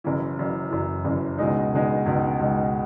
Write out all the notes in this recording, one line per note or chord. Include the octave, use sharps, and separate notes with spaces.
F#1 F#2 E3
F#1 F#2 E3
F#1 F#2 E3
F#1 F#2 E3
C#2 B2 G#3 D#4
C#2 B2 G#3 D#4
C#2 B2 G#3 D#4
C#2 B2 G#3 D#4